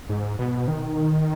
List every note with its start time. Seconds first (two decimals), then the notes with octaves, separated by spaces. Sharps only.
0.09 G#2
0.39 B2
0.68 D#3